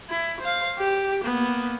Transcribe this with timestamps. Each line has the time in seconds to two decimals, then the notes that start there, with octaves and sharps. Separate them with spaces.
0.10 E4
0.41 C5 F5
0.78 G4
1.24 A#3 B3